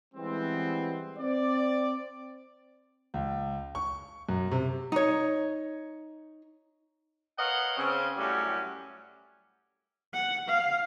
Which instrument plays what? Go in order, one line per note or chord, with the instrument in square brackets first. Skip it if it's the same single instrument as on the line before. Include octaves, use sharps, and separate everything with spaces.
[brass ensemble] E3 G3 G#3 B3 C4
C4 D5
[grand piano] C#2
C#6
F#2
C3
[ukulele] D#4 C#5
[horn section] A#4 B4 C#5 D#5 F5 F#5
C#3 C4 C#4
F#2 A2 F#3 G3 C#4 G4
[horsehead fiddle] F#5
F5